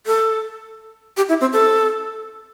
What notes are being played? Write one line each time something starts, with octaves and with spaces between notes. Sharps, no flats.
A4
G4
E4
C4
A4